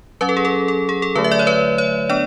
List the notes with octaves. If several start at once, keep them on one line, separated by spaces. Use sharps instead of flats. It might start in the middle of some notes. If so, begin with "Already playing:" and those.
F#3 C#4 B4
A4
G#4
A4
A4
G#4
A4
D3 F#3 A3 B4
E5
D5
C#5
B4
C#5
B3 D4 D5